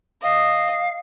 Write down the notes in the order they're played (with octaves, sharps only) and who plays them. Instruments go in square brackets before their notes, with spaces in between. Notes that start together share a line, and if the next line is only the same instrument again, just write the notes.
[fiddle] D#5 [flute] F5